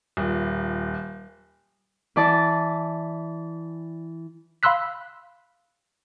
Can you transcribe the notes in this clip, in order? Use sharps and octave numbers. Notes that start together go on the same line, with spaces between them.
D#1
E3 D5 A5 D6
F5 B5 C6 E6 F#6 B6